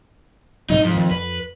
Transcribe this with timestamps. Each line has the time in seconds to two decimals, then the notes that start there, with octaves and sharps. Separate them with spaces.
0.70 G#2 C3 F#3 D#4
0.84 F2
0.97 D#3 F3 A3
1.11 F2 B4